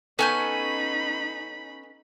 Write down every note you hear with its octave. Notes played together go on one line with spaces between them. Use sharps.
B3 C#4 D#4 A4 G#5 B5 G6